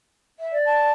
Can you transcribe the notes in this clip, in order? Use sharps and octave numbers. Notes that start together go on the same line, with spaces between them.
E5
D5
A5